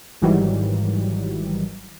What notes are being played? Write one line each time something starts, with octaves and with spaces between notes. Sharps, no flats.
G#1 G#2 D#3 E3 F#3 G3